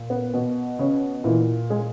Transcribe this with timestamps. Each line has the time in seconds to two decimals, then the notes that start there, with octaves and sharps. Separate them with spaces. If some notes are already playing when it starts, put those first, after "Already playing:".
Already playing: A#2
0.10 B3
0.34 B2
0.79 C#3 C#4
1.24 A#2 E3 E4
1.70 G#3 G#4